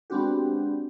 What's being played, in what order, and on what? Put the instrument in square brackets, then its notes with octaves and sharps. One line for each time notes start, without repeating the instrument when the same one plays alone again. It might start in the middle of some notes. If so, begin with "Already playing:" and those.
[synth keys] G#3 B3 C4 D4 F#4 G4